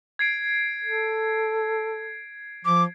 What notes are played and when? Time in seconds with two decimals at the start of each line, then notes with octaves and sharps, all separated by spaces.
0.19 G#6 C7 D7
0.84 A4
2.65 F3 D6